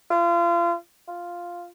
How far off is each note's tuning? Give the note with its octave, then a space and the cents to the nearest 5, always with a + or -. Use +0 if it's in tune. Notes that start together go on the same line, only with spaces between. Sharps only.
F4 -30
F4 +0